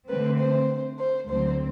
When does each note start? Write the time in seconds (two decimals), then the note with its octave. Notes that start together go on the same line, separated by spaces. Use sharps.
0.09 D3 A3 C4 B4
0.39 C5
0.99 C5
1.29 D2 D3 F#3 C4 C5